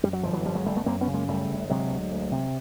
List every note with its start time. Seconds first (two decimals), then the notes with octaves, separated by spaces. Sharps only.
0.03 F#2 G3
0.13 F#3
0.23 G1 F3
0.33 E3 F#3
0.46 G1 F3 G3
0.55 F#3 G#3
0.66 G1 G3 A3
0.76 A3 B3
0.86 F#2 A#3 C4
1.01 B3 C#4
1.07 C#3
1.14 G#3 A#3
1.28 F#2 G3 A3
1.49 G1
1.70 C3 F#3 G#3
1.91 D2
2.11 D2
2.31 C3